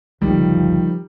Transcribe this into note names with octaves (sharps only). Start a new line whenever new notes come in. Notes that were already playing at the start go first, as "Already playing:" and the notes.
F#1 D2 D#3 F3 G3